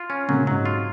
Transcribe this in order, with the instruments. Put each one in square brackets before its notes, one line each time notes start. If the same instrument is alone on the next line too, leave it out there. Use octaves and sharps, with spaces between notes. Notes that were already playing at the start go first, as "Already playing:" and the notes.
Already playing: [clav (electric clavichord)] F4
C#4
[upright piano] A#2 C#3 [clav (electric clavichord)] F#3
[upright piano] G#2 C3 [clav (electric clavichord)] F#3
[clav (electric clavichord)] F4